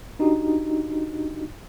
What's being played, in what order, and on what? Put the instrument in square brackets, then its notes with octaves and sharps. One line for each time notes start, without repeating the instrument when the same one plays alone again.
[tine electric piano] D4 D#4 F#4 G4